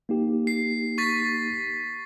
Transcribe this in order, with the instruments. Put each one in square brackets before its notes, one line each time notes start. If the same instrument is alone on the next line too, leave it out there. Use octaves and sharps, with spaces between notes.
[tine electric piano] A#3 D#4 G4
[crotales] C7
C#6 A6 B6